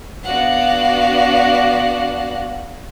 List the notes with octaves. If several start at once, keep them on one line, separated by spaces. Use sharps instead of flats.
B3 D4 F#4 F5 F#5